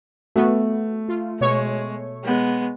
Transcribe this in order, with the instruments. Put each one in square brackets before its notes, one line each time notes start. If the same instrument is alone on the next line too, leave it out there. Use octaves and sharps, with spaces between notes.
[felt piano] A3 [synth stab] B3 F#4
[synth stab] F4
[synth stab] B2 C#5 C#6 [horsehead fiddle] G#3
[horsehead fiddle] G#3 B3